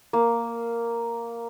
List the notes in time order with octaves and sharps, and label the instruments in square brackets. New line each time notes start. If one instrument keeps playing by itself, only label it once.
[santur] A#3